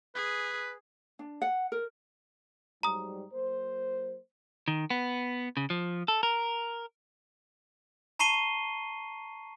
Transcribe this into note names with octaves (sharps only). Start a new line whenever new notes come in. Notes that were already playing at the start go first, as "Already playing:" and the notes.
G#4 B4
D4
F#5
A#4
G#2 F#3 G3 A#5 D#6
F#3 A#3 C5
D#3
B3
C#3
F3
A4
A#4
A5 A#5 C#6 C7 D#7 G7